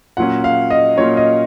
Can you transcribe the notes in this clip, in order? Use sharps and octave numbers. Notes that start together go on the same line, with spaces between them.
A#2 F#3 C#4 F#5
F5
D#5
A#2 F#3 C#4 C#5
D#5